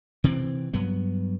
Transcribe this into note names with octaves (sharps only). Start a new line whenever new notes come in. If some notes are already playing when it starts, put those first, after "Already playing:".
C3 E3 C4
G2 F#3 B3